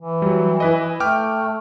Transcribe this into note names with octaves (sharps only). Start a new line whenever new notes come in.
E3
F#3 G3
E4 B4 D#5
A3 G5 D6 F6